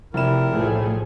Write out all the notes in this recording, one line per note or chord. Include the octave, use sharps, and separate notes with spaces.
F1 C3 E4 A#4 E7
B1 A2 F3 A3 G#4